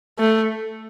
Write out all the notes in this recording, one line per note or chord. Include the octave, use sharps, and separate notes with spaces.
A3